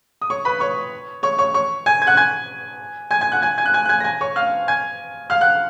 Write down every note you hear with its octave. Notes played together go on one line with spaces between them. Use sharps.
D#6
C#5 C#6
B4 B5
C#5 C#6
C#5 C#6
C#5 C#6
C#5 C#6
G#5 G#6
G#6
F#5 F#6
G#5 G#6
G#5 G#6
G#5 G#6
F#5 F#6
G#5 G#6
G#5 G#6
F#6
G#5 G#6
F#6
G#5 G#6
A#6
G#5 G#6
C#5 C#6
F5 F6
G#5 G#6
F5 F6
F#5 F#6